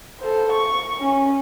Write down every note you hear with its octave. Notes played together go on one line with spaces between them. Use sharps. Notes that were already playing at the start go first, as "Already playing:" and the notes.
A4 C5
C#6
C#4